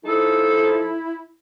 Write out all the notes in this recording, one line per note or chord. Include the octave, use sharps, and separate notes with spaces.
F3 D#4 E4 A4